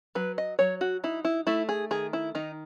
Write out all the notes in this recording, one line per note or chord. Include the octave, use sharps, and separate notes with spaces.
F#3 B4
D#5
F#3 C#5
F#4
D#4 E4
E4
A3 E4
G#4
D#3 G#4
E4
D#3 D#4